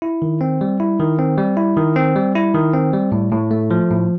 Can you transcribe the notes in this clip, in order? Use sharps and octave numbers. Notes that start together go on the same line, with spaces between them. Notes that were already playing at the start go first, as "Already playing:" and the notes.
E4
D#3
C4
G3
E4
D#3
C4
G3
E4
D#3
C4
G3
E4
D#3
C4
G3
A2
A2
A3
F3
A2